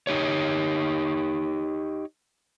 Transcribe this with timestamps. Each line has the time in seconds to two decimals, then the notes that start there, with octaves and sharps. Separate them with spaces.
0.07 D#4 G4 C#5